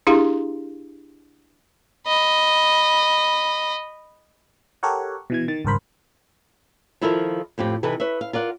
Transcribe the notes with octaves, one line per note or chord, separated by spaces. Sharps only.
D4 E4 G4 G#4 F5 C6
D#5 B5
G4 A4 A#4 C#5 F#5
B2 E3 G#6
D#3 A6
G#1 C#2 G2 A#4 C5 B5
D#3 F3 E4 F4 A4 A#4
F2 A2 C4 G4
C3 E3 D#4 A4 B4
B4 C#5 E5
F5
F4 A#4 D5 F#5